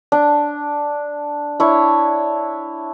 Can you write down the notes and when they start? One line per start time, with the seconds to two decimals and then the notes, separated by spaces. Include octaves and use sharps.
0.12 D4
1.60 D4 E4 C#5